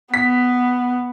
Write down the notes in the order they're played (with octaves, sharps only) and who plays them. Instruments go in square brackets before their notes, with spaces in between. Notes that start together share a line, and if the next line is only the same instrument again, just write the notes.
[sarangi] B3 [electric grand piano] B6